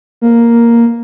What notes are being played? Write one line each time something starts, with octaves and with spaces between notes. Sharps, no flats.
A#3